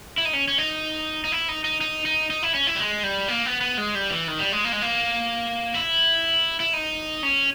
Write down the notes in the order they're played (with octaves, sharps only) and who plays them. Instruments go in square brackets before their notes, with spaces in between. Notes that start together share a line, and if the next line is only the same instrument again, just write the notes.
[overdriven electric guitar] E4
D#4
C#4
C#4
D#4
D#4
E4
D#4
D#4
D#4
D#4
D#4
E4
C#4
E4
G3
G#3
G3
A#3
B3
B3
G#3
G3
E3
D#3
G3
G#3
A#3
G#3
A#3
E4
E4
D#4
C#4